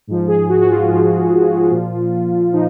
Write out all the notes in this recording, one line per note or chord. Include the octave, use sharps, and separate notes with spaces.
G#2 F3
G#4
F#4
F#4
F4
G#2 F3 F4
A#2 F3
A#2 F3 D#4